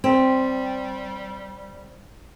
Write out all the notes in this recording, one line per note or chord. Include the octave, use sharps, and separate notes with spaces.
G3 C4